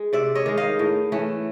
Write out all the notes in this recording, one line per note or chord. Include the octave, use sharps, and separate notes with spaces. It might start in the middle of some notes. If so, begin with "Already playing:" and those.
Already playing: G#3
C3 D5 E5
C#5 D#5
D#3 G#3
D#5 F5
A2
E3 A3 C#4